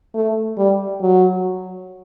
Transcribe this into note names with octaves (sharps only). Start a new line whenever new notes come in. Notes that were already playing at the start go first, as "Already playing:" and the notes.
A3
G3
F#3